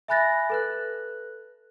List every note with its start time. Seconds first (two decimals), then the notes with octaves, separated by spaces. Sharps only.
0.08 E5 G#5 B5 F#6 A6 A#6
0.50 A4 B4 F#6